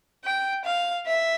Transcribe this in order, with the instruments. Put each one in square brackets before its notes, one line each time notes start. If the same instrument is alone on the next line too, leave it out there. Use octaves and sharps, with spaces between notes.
[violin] G5
F5
E5